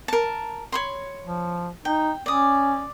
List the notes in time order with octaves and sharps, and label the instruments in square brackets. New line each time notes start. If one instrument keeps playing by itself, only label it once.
[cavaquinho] A#4 A5
C#5 B5 C6
[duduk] F3
[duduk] D#4 [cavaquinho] G5
[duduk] C#4 [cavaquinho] D5 D#6